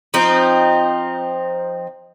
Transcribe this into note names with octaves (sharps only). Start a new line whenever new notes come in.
F3 C4 D#4